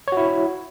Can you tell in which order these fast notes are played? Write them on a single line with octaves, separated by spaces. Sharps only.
C#5 F#4 E4